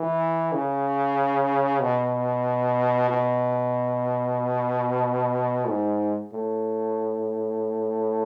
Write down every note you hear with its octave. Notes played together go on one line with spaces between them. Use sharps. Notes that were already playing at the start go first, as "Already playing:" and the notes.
Already playing: E3
C#3
B2
B2
G#2
A2